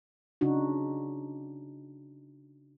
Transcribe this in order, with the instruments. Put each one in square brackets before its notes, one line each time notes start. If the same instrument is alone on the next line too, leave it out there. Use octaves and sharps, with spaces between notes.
[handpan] C#3 D4 D#4 F#4